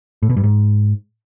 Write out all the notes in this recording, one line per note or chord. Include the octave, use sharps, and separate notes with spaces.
A2
B2
G2
G#2